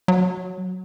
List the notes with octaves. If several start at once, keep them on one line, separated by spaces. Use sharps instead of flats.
F#3